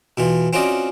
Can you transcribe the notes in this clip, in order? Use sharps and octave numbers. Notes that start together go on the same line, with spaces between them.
B2 E3 F4
C4 C#4 F4 F#4 D5 D#5